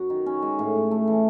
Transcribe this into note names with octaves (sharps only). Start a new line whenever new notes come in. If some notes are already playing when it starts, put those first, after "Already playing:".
Already playing: F#2 F#4
D#3
C#4
G#3
A2
A2
A3
E3